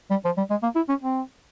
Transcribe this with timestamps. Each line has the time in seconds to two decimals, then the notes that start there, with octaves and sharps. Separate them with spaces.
0.11 G3
0.25 F3
0.37 G3
0.50 G#3
0.63 A#3
0.76 E4
0.89 C#4
1.02 C4